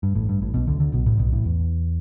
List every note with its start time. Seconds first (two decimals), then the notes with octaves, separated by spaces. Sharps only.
0.03 G2
0.15 A1 A2
0.29 G2
0.41 A1 A2
0.54 B1 B2
0.67 D2 D3
0.80 D2 D3
0.93 B1 B2
1.06 A1 A2
1.19 B1 B2
1.32 A1 A2
1.46 E2